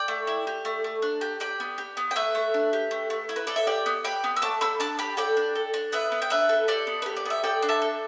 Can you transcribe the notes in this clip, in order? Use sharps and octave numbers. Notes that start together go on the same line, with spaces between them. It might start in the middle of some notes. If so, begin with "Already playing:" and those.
Already playing: D5 G5
A3
E4
G4
A3
A3
D4
G4
G4 D5 G5
B3
G4
B3
G5
A3 B4 E5
A3
D4
G4
A3
A3
E4
B4
A4 D5
E5
G4 D5 G5
B3
G4 G5 B5
B3
E6
A3 A5 D6
A3 B5 E6
D4 A5 D6
G4 G5 B5
A4 D5 G5
D4
A4
D4
B3 B4 E5
B3
G5
D4 B4 E5
A4
G4 A4 D5
B3
B4
G4
D5
B3 E5
A4 D5 G5
D4
E5 A5
A4